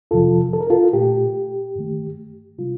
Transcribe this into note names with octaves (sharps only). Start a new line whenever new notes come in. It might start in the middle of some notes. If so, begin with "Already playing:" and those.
F2 C3 F3 F4 A4
A4
A#4
F4 A4
A#2 A3 G4
G2 D#3 A3
C3 G3 F4